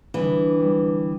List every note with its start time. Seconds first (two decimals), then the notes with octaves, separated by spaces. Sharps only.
0.14 D3 E3 G3 B3 D4
0.60 G3 B3 D4